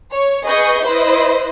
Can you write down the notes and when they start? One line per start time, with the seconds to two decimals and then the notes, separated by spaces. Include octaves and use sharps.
0.12 C#5
0.44 G#4 B4 D#5 C#6 G6
0.83 E4 B4 C5 D#5